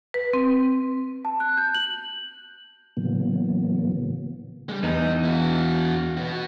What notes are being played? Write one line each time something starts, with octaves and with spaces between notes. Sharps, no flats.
B4
C4
A5
F#6
G6
F#7
A2 C#3 E3 F#3 A#3 B3
G3 G#3
E2 B3 D#4
E4 F#4
B3 F#4